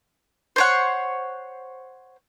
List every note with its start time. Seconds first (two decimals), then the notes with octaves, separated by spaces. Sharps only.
0.56 C5 C#5 F#5